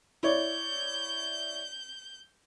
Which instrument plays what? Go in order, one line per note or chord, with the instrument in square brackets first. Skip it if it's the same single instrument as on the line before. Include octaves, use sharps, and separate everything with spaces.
[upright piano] E4 C#5 D5 [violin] G6